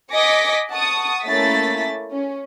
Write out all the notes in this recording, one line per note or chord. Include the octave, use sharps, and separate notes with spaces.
D#5 G#5 D6 A#6 B6 C#7
F#5 A5 C#6 D#6
A3 A#3 C#4 E4 A6 B6
C#4